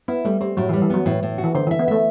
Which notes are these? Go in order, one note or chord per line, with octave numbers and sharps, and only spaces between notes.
B3 E4
G3 A3
G3 C4
A2 F#3
E3
G3
E3
F#3 B3
A2 E3
A2
F#4
E3
D3 C5
E3
E5
B3
A3 E5